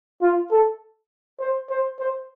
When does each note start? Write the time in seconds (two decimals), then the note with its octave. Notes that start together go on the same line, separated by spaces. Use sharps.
0.22 F4
0.51 A4
1.40 C5
1.70 C5
2.00 C5